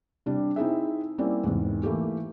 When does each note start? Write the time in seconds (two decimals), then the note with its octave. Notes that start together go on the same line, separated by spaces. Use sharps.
0.26 C3 G3 D4
0.56 C4 D#4 E4 G#4 E5
1.18 G3 A#3 C4 C#4 E4 D5
1.43 E2 G#2 C3
1.83 E3 A3 A#3 G4